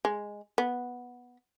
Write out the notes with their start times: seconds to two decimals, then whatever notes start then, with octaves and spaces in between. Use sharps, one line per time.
0.05 G#3
0.58 B3